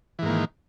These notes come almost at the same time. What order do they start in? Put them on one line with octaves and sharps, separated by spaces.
E3 G#2 A#3 D#3